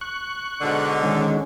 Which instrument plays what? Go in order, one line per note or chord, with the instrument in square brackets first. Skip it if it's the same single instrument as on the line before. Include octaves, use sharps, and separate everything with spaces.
[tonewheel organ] C#6 F#6
[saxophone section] G#2 B2 D3
[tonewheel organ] D#3 G#3 C#4